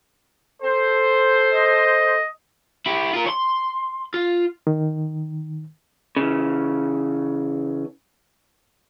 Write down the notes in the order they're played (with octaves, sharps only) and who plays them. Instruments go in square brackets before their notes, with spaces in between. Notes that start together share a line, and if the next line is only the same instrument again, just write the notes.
[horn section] A4 C5
[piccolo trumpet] D#5
[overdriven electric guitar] E4 G4
F4 A#4
C#5 C6
F4
[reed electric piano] D#3
[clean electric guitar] C#3 E3